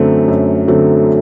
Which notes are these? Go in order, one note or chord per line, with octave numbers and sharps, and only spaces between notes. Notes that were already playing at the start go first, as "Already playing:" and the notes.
Already playing: F#2 D3 F#3 A3 C4
F#2
D3 F#3 A3 C4